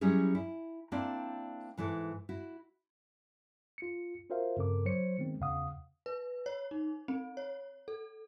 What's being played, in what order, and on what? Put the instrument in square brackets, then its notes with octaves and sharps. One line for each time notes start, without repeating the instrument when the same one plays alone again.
[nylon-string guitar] F#3 G3 C#4 E4 G#4
E4
A#3 C4 D4 E4 D5
G#2 E3 E4 A4
E4 F#4
[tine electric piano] F4 C#7
F4 F#4 A#4 C5 E5 F5
G2 C#3 C4 A4 A#4 D6
F#3 C5 C#5 C#7
D#3 G#3 B3 C4
E2 C#3 F5 F#5 D#6
[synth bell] B4
C#5
D#4
C4
C#5
A4